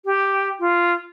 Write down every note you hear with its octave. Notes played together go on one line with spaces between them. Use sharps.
G4
F4